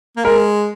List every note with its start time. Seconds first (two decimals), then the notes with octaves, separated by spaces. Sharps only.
0.16 A#3
0.24 G#3 A#4